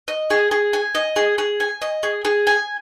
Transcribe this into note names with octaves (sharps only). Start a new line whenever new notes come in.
D#5
G#4
G#4
G#5
D#5
G#4
G#4
G#5
D#5
G#4
G#4
G#5